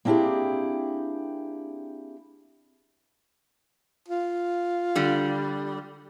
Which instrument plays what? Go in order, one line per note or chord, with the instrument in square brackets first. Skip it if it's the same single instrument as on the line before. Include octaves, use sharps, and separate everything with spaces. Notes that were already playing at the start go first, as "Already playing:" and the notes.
[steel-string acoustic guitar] A#3 C4 D4 E4 G4 G#4
[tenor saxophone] F4
[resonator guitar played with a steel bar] D3 G3